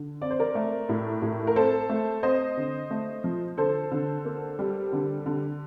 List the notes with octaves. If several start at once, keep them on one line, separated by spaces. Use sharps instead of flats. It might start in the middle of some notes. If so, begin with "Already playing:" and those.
Already playing: D3
C4 D5
C5
A#4 D5
A3
A2
A2
A#4
C4 A4 C5
A3
C4 C5 D#5
D3
A3
F3
D3 A4 C5
D3
A#3
G3
D3
D3